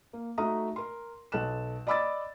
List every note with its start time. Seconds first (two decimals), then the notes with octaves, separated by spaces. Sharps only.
0.13 A#3
0.38 A3 D#4 F#4 E5 A#5 D#6
0.76 A#4 C6
1.32 B1 A4 A5 F#6 E7
1.87 D5 D#5 B5 D6 E6 A6